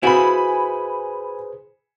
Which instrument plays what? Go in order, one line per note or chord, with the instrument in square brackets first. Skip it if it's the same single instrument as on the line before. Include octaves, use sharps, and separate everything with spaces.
[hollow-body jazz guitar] E4 F#4 [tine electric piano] G#4 B4 C5 [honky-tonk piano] G#5 B5